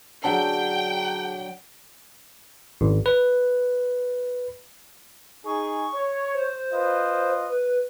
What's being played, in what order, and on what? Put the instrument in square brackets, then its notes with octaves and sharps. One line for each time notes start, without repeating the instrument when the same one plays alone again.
[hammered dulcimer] D3 F#3 [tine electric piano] G#4 F#5 A5 [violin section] G5
[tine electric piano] G#1
B4
[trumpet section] D#4 G#4 [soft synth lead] C#6
[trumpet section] C#5
[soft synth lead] C5
[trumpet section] F4 B4 D#5
[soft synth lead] B4